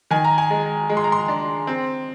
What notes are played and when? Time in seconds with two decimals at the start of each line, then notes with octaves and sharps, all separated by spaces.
0.11 D#3 G#5
0.25 A#5
0.38 G#5
0.50 G#3
0.89 G#3
0.97 C6
1.04 A#5
1.12 C6
1.28 D4
1.67 C4